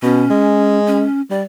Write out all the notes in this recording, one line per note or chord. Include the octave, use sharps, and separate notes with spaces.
B2 C#4
G#3
C#4
G3 D5